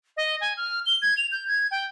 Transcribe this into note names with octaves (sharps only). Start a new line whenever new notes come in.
D#5
G#5
F6
G7
G#6
F7
G6
G#6
G5